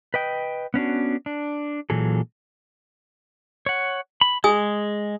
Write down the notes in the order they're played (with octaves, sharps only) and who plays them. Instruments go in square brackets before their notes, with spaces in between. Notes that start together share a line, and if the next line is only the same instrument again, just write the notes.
[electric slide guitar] B4 D#5 G5
B3 C#4 D4 F#4
D4
A#2 E3 F#3 G#4 A4
[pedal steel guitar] C#5 F#5
B5
[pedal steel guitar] G#3 [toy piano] G#4 G#5 D#6